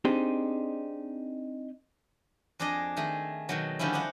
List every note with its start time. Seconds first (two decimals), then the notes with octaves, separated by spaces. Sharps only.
0.05 C4 D4 D#4 G4 G#4 C5
2.59 F2 D4 G#4 D5 D#5
2.97 D#3 A3 G#4
3.49 B2 D#3 F#3
3.79 D3 D#3 F3 G3 C#4 E4
3.93 D4 D#4 C5 F#5